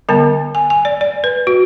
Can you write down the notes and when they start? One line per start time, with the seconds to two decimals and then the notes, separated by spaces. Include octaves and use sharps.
0.09 D3 G3 B3 A5
0.55 G#5
0.70 G#5
0.85 D5
1.01 D5
1.24 B4
1.47 F#4